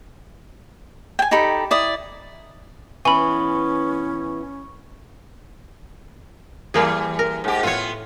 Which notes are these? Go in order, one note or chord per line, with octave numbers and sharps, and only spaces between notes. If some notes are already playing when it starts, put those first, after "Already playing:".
G5 G#5
D#4 G4 A4 B5
E4 D5 D#6
E3 B3 C#4 G#5 B5 C#6
E3 G3 A#3 G#4
A#4
G#2 G4
A2 B3 F4 C#5